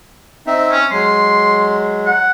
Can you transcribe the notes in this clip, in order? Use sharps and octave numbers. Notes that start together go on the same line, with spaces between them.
C4 D#4 E5
C#4
F#3 G#3 C6
F#5